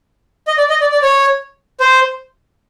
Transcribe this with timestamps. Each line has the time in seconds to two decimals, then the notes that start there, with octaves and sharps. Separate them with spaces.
0.47 D#5
0.58 D5
0.70 D#5
0.81 D5
0.92 D5
1.02 C#5
1.80 C5